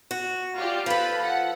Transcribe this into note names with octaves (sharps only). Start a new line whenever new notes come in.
F#4
F4 G4 D5
F3 A4 B4 B5
F#5